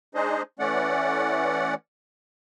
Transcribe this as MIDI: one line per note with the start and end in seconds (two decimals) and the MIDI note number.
0.15 0.42 56
0.15 0.42 62
0.15 0.42 63
0.15 0.42 68
0.15 0.42 72
0.15 0.42 75
0.59 1.74 52
0.59 1.74 57
0.59 1.74 61
0.59 1.74 74
0.59 1.74 78